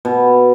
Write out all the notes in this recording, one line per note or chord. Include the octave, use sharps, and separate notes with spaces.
B2